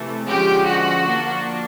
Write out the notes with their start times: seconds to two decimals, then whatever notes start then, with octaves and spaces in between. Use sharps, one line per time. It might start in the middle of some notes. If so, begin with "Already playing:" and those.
Already playing: C3 E3 A3
0.27 D3 F3 G#3 C#4 G4
0.66 F#4
1.06 F3 A#3 D4